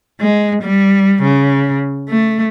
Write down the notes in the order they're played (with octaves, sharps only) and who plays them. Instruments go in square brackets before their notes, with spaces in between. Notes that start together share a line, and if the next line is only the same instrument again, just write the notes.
[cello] G#3
G3
C#3
A3